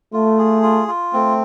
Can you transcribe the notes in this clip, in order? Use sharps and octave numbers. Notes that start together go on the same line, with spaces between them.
A3 F4
G#4
F4
F4
A3 C4